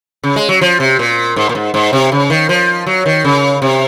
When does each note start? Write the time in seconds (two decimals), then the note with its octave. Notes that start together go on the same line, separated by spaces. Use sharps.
0.23 C#3
0.36 G#3
0.49 F#3
0.61 F3
0.80 C3
0.99 A#2
1.36 G#2
1.49 A#2
1.55 G#2
1.74 G#2
1.93 C3
2.12 C#3
2.30 D#3
2.49 F3
2.86 F#3
3.06 D#3
3.24 C#3
3.62 C3